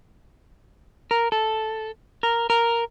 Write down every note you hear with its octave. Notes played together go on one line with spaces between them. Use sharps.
A#4
A4
A#4
A#4